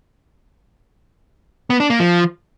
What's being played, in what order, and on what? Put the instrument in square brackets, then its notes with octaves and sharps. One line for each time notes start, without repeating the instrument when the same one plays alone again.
[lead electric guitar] B3
D4
A#3
F3